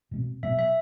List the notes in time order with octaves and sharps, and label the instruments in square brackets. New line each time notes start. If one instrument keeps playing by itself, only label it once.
[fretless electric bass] B2 A3
C4
[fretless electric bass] B2 F#3 B3 [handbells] E5
[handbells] E5